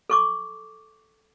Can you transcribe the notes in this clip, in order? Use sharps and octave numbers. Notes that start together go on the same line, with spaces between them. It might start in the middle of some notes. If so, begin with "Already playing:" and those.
A4 C#6 D6